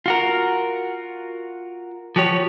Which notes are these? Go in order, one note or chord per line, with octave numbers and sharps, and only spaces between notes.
F4 F#4 A#4
F3 F#4 G4 C#5